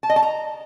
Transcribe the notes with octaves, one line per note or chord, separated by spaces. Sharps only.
A5
D#5
A5
A#5